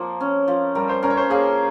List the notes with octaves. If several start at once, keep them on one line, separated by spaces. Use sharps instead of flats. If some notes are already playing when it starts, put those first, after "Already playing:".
Already playing: F3 A#3
C#4
F3
G3 A#4
C5
C#4 A#4
C#5
C5
A#3 G#4